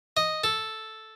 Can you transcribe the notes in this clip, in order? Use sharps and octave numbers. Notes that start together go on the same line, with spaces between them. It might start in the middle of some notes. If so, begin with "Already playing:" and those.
D#5
A4